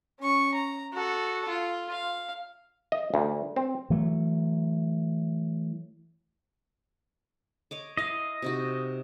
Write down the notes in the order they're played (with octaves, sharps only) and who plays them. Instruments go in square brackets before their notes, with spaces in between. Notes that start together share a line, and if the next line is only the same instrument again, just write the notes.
[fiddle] C#4 C#6
A#5
F#4 A4
F4
F5
[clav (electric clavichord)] D#5
D2
C4
[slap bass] E3 F#3 A3
[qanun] C#5 D#5 D6
[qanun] E4 F5 [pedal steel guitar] D#5
[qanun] C3 D#4 F#4